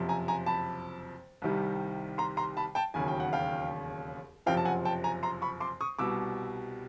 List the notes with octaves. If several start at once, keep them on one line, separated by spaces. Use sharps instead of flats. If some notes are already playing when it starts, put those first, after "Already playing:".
Already playing: F#1 F2 C3 F3
G#5 A#5
G#5 A#5
A5 B5
C2 C3 D#3 G3
A#5 C6
A#5 C6
A5 B5
G5 A5
E1 D#2 C#3 F#3 G#5
G5
F#5
F5 G5
F#1 F2 C3 F3 F5 G5
A5
F#5 G#5
G5 A5
G#5 A#5
A#5 C6
B5 C#6
C6 D6
C#6 D#6
C2 B2 G3 D6 E6